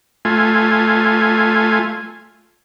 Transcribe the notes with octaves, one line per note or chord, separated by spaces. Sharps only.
A3 F4 G#5